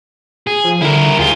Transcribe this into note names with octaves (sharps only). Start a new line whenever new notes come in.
G#4
F3
D3 E4 A#4
D#2 F4 G#4